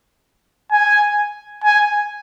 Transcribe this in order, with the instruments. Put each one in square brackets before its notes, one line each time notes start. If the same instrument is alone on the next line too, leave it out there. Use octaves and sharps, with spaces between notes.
[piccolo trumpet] G#5
G#5